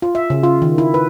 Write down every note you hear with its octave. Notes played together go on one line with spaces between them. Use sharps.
F4
E5
C#3
F4
D#3
E4
B4